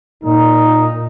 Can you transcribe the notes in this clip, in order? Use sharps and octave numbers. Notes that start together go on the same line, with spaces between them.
A#2 D#4